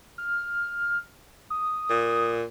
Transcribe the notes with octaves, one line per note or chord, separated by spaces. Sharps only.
F6
D#6
A#2